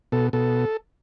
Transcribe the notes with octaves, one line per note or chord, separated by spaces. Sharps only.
B2 A4
B2 A4